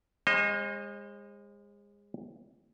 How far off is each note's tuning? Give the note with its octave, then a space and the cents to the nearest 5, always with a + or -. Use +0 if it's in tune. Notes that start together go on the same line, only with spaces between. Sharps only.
G#3 -30 C5 +45 D#5 +0